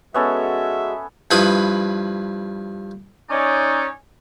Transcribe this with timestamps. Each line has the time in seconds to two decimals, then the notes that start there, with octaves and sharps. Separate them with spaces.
0.14 G#3 B3 C#4 F#4 A4 E5
1.31 G2 F3 E4 B4 B5 D#6
3.30 C#4 D#4 C#5 D5